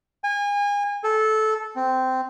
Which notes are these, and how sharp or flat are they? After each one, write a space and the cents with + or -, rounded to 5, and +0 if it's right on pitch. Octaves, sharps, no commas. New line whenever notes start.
G#5 -30
A4 -15
C4 -15